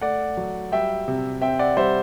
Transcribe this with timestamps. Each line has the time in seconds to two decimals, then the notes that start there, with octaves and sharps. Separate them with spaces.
0.01 A3 D5 F#5
0.37 F#3
0.72 G3 E5 G5
1.08 C3
1.42 C4 E5 G5
1.59 D5 F#5
1.77 G3 C5 E5